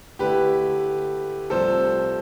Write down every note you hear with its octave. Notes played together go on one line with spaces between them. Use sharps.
D3 A3 E4 G4 B4
C2 C3 F3 A3 A4 C5